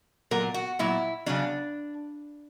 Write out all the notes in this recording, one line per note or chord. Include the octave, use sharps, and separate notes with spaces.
A#2 F#3 A#4
F#4
A#2 F#3 E4
C#3 F#3 D4